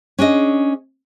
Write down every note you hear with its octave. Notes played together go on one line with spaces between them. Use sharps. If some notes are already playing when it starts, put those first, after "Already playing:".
C#4 D4 G#4 D#5